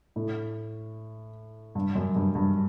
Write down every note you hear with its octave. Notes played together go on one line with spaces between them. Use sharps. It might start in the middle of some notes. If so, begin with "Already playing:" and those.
A2
G2
F#2
G2
G2